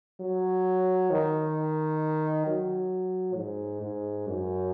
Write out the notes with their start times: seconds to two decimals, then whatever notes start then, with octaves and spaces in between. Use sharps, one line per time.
0.20 F#3
1.10 D#3
2.46 F#3
3.37 G#2
3.82 G#2
4.27 F#2